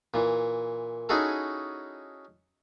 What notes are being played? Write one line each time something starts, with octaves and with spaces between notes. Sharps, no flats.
A#2 E3
C#4 D#4 E4 F#4 G#4 A4